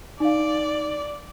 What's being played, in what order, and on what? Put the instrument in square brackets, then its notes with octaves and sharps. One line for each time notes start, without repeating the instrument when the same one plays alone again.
[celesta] D#4 F5 [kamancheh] D5